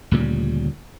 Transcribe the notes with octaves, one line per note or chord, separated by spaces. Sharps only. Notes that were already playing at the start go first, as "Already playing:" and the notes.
D2 A#2 C#3 G3